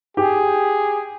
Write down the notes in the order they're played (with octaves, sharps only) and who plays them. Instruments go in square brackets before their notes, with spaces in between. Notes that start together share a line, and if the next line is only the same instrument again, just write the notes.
[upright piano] G4 [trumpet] G#4